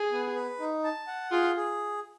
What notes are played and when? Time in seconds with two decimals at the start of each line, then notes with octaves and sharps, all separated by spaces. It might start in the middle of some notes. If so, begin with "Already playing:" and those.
Already playing: G#4
0.12 B3
0.35 B4
0.60 D#4
0.84 A5
1.07 F#5
1.32 F4 G#4
1.56 G#4